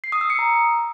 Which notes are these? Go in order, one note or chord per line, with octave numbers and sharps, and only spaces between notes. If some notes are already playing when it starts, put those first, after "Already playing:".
C7
D#6
E6
C#7
A#5